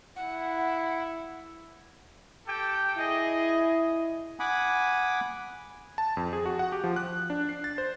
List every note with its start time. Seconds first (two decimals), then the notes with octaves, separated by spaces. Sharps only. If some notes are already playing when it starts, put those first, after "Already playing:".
0.16 E4 F#5
2.47 G4 A4 G5
2.98 E4 G#4 D#5
4.40 F#5 G#5 B5 D6 D#6
5.98 A5
6.17 F2
6.33 G#4
6.46 F#4
6.59 F#5
6.72 G4
6.84 F3
6.96 F#6
7.30 D4
7.49 C7
7.64 A6
7.78 C5